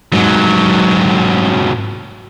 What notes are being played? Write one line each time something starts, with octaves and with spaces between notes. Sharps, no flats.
G#2 F#3